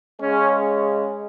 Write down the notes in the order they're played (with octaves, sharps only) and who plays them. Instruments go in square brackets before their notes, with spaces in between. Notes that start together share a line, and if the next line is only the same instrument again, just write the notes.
[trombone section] C#3 G#3 C#4